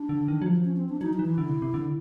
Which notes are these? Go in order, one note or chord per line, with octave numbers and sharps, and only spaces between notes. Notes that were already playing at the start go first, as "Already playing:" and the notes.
Already playing: D4
D3
D#3
F#3
F3
C#4
C4
D4
F#3 D#4
D#4
E3
E4
D3
C3
C3
D3